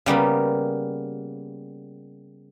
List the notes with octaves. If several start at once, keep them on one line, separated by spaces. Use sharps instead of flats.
C#3 G3 A#3 B3